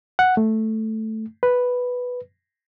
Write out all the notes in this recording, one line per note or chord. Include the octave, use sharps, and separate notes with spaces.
F#5
A3
B4